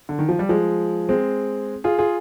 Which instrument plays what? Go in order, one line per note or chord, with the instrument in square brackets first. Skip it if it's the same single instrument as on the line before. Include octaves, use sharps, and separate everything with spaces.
[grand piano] D3
D#3
F3
G3
F3 G#3
G#3 C4
F4 G#4
F4 G#4